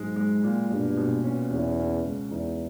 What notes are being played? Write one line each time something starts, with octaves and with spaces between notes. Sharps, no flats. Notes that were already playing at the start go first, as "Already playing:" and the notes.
Already playing: B1 G#2 G#3
G#3
A#2
G2 B2
B2
C#4
E2 C#4
C#4
C#2
E2 D#4